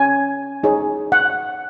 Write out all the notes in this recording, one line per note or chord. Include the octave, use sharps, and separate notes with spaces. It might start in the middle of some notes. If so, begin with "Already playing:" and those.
Already playing: C#4 G#5
D#4 G#4 C#5
F#5